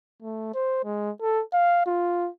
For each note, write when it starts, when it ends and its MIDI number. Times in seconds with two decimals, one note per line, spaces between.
0.22 0.50 57
0.54 0.80 72
0.84 1.11 56
1.22 1.42 69
1.53 1.85 77
1.86 2.30 65